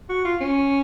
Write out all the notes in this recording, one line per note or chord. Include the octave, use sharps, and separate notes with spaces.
F#4
F4
C#4